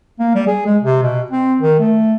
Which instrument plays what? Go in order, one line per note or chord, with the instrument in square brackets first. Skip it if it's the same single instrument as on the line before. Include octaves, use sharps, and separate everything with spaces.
[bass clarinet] A#3
G3
G#4
G#3
C3
B2
C4
D#3
A3